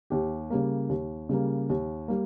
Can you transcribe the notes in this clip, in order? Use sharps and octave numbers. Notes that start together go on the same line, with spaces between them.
D#2 G4
C#3 G3 A#3
D#2
C#3 G3 A#3
D#2
G3 A#3